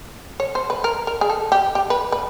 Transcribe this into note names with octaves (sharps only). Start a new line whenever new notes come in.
C#5
C5
B4
A#4
A#4
G#4
A4
G4
G4
B4
B4